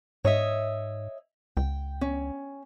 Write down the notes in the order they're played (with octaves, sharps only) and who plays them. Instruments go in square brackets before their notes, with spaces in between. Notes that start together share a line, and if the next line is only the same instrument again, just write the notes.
[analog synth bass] G#2 [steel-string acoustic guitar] C#5 D#5 E5
[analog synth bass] C#2 [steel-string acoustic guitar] G5
[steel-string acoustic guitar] C#4